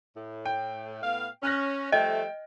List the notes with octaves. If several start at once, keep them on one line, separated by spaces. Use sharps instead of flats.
A2
G5
A2 B3 F5
C#4 F6 F#6 A#6
F3 G3 A3 D#5 G5